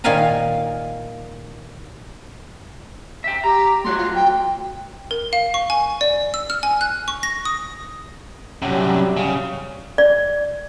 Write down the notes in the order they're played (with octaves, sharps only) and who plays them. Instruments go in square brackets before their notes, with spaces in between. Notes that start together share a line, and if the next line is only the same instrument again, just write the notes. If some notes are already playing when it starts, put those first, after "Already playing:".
[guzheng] A#2 D#3 A#4 F5 G#5 A#5
[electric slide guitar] E5 G5
[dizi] G4 [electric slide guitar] A#5
[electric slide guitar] A3 F#4 C#5 [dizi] C6
[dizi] F4
G5
[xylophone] A#4
F5
C#6
G#5
D5
E6
F6
G#5
F#6
C#6
A#6
D#6
[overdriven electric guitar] F#2 C3 [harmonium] F#3 G3
[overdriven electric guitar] C#3
[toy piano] D5